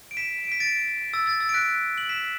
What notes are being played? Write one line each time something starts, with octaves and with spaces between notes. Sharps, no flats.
D7
B6 E7
D7
B6
A6 D7
E6 A6
E6 A6
E6 A6
D7
F#6 B6
F#7
B6 E7